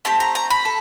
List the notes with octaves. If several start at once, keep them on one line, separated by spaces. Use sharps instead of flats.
A3 C4 G4 A5
A#5
A#5
B5
A4